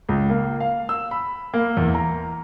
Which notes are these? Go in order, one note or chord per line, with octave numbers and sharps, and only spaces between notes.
C#2
A#3
F5
E6
B5
A#3
E2
A#5